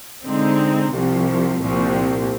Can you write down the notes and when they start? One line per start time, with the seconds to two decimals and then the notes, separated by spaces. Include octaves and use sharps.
0.25 D3 G#3 C4 D#4
0.94 C2 C3 F3 C4
1.62 C2 A#2 F3 C4